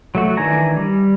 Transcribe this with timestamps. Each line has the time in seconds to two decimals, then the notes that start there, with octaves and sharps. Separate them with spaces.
0.15 F#3 A3 F#4
0.37 D#3 E3 D4 G#5 A#5
0.77 G3